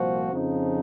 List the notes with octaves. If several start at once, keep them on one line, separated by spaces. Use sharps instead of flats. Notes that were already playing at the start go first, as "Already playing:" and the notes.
Already playing: C2 A#2 F3 C4 F#4
F2 C#3 F3 C4 D#4